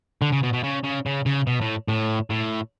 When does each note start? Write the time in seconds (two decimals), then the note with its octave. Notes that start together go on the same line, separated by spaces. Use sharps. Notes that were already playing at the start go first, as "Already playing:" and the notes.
0.22 D3
0.32 C#3
0.43 B2
0.53 B2
0.64 C#3
0.84 C#3
1.06 C#3
1.26 C#3
1.47 B2
1.61 A2
1.88 A2
2.30 A2